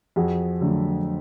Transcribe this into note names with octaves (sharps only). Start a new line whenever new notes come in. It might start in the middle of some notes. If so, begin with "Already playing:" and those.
F2 F#4 G#4
D3 F#3 A3